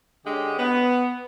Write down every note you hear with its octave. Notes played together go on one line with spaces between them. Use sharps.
D3 G#3 C#4 G4
B3